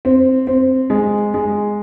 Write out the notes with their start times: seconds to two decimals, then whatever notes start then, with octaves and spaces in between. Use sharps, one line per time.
0.05 C4
0.47 C4
0.90 G#3
1.34 G#3